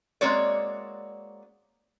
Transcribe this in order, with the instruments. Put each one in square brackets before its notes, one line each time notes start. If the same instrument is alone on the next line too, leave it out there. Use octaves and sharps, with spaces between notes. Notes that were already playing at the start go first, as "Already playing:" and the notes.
[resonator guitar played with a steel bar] G#3 A#3 C4 F#4 C#5 D5